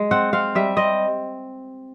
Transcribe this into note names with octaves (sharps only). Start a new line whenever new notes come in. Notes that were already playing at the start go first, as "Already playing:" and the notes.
Already playing: G#3
C4 F#5
C4 F5
G3 E5
C4 D#5